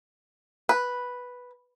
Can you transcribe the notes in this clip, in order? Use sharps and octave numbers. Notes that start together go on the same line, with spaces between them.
B4